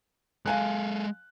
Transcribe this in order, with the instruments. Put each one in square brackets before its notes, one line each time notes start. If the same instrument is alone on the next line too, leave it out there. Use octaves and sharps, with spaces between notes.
[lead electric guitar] G#3 A4 [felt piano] F5 G#5 F#6